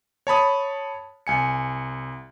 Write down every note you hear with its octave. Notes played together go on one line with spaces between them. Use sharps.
C#5 A5 B5 D#6
C2 G#5 C#7